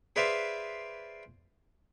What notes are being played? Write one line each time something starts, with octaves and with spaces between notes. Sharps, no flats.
G#4 B4 C5 D5 E5 F5